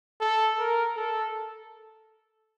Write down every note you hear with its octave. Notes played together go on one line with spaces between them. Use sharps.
A4
A#4
A4